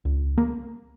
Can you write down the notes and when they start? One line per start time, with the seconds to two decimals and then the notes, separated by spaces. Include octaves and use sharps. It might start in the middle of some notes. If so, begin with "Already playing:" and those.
0.05 C#2
0.38 A#3